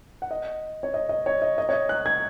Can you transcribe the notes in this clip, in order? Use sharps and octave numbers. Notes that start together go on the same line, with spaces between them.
F#5
D#5
C#5
D#5
D#5
C#5
D#5
D#5
C#5
D#5
F#6
G#6